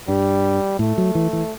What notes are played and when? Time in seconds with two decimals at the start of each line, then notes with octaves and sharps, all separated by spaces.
0.08 G2 G3
0.79 A2 A3
0.98 F#3
1.15 E3
1.33 E3